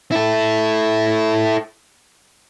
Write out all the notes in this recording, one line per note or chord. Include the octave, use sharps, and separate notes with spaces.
E4 A4